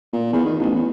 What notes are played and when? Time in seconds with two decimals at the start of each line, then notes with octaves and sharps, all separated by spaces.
0.12 A#2
0.33 E2
0.45 D#3
0.59 A1
0.75 E2